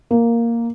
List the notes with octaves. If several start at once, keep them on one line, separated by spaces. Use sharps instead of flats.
A#3